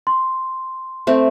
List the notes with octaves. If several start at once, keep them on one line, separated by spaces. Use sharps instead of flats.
C6
A3 C4